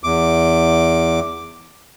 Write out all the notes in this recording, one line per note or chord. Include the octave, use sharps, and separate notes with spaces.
E2 D6